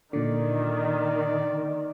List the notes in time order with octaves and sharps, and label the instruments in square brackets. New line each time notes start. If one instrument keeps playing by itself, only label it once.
[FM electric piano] A#2 D3 [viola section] D#3 [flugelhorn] D5